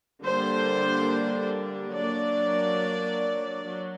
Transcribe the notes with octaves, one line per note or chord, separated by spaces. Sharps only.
D3 G3 A#3 D4 C5
F#3 A#3 D4 D5
F#3